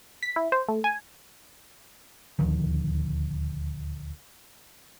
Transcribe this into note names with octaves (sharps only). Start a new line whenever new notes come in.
B6
E4
C5
A3
G#5
D#1 D2 D#3 F3